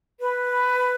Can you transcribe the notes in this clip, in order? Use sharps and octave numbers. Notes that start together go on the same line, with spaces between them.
B4